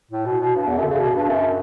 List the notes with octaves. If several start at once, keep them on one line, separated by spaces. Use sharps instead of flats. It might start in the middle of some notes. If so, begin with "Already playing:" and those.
A2
B2
B2
G2
E2
F#2
D3
C#3
B2
G2
F#2